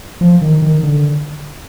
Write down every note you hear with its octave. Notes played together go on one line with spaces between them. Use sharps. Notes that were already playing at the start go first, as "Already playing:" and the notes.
F3
D#3
D#3
D3